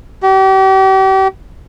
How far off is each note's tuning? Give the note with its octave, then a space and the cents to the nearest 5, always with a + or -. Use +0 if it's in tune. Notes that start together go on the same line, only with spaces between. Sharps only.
G4 -40